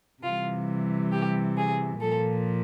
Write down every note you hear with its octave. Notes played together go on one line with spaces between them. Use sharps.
C3 E3 G3 F4
G4
G#4
A#2 F3 A4